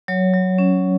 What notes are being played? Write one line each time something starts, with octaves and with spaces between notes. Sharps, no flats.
F#3 C#5
F#3
C#4